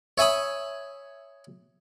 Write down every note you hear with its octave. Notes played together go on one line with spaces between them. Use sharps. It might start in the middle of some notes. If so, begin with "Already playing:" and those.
C#5 E5 G#5 B5 D#6